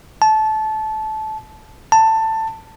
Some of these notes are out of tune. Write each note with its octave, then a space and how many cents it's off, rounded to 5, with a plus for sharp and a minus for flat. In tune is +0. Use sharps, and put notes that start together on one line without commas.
A5 -20
A5 +15